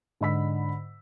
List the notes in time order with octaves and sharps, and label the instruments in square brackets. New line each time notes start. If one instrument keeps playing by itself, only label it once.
[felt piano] G#2 D3 D#5 B5 E6 B6